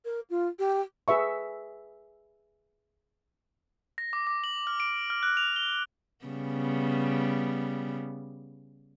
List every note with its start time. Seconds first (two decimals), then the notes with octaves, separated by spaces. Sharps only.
0.05 A#4
0.30 F4
0.59 G4
1.08 G#4 B4 E5 C#6
3.98 A#6
4.13 D6
4.27 D6
4.44 F#7
4.67 F6
4.80 D7
5.10 F6
5.23 F#6
5.37 F7
5.56 G7
6.25 C#3 G3 B3